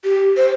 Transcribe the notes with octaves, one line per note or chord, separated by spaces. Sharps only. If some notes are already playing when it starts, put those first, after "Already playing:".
G4
C5